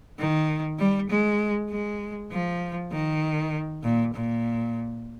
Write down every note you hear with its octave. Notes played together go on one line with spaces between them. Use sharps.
D#3
G3
G#3
G#3
F3
D#3
A#2
A#2